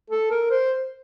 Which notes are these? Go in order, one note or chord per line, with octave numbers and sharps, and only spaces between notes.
A4
A#4
C5